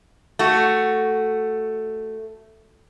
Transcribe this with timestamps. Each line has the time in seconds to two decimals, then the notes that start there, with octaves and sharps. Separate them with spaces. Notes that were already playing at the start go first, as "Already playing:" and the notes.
0.39 A3 F#4